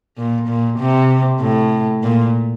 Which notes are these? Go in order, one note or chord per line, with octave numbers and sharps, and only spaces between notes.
A#2
A#2
C3
A2
A#2